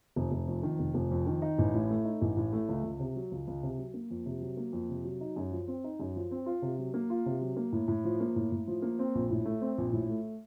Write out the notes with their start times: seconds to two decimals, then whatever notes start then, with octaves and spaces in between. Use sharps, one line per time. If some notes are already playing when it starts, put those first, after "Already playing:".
0.16 F1
0.31 F1
0.47 F2
0.63 D#3
0.79 F1
0.94 F1
1.11 F2
1.26 D#3
1.42 D#4
1.59 A1
1.74 A2
1.90 A3
2.05 D#4
2.22 A1
2.37 A2
2.53 A3
2.69 C#2
2.83 C#2
3.00 C3
3.16 F#3
3.31 C#2
3.48 C#2
3.63 C3
3.78 F#3
3.94 A#3
4.10 F2
4.26 C3
4.41 F#3
4.57 A#3
4.73 F2
4.89 C3
5.04 F#3
5.21 D#4
5.36 F#2
5.51 F3
5.68 C4
5.84 D#4
6.00 F#2
6.16 F3
6.31 C4
6.46 F4
6.62 C3
6.79 F#3
6.94 A#3
7.10 F4
7.26 C3
7.41 F#3
7.56 A#3
7.72 A2
7.88 A2
8.04 F3
8.20 A#3
8.36 A2
8.52 A2
8.67 F3
8.82 A#3
8.99 C4
9.15 A#1
9.30 A2
9.45 A3
9.62 C4
9.78 A#1
9.93 A2
10.09 A3